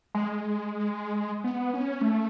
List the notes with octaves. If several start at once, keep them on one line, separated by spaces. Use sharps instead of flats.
G#3
B3
C#4
A3